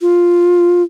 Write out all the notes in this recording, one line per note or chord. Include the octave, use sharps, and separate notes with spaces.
F4